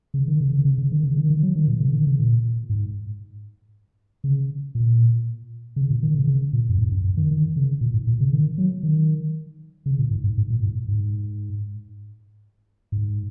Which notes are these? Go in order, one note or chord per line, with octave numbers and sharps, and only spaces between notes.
C#3
D#3
C#3
C#3
C#3
C#3
D#3
C#3
D#3
D#3
F#3
D#3
A#2
C#3
D#3
C#3
A#2
G#2
C#3
A#2
C#3
A#2
D#3
C#3
C#3
A#2
F#2
G#2
F#2
F#2
D#3
D#3
C#3
A#2
G#2
A#2
C#3
D#3
F#3
D#3
C#3
A#2
G#2
G#2
G#2
A#2
G#2
G#2
G#2